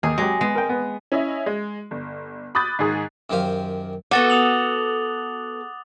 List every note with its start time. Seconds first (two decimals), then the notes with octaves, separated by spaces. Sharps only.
0.03 D#2 G#4
0.18 F#3 G#3 G4
0.41 G#3 B3
0.55 A#4 G5
0.69 B3
1.12 C#4 E4 D#5 E5
1.46 G#3
1.91 G1
2.55 B5 D6 D#6 F#6 G6 A6
2.79 G#2 D#3 G#4 D#6
3.30 F#2 D#3 G4 C5 F5
4.11 B3 F#4 A4 F#5 D6 A6 G7
4.30 D#6 F7 F#7